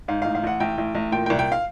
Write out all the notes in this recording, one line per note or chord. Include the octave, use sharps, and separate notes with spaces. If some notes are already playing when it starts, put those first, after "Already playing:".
G#2 F5
A1 F5
F5
A1 F#5
A1 G5
A1
A1
A#2 G5
G5
C2
G5
F5